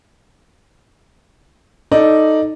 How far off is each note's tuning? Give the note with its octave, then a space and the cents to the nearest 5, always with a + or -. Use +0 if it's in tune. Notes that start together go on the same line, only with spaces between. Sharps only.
D#4 +0 A4 +0 D5 +0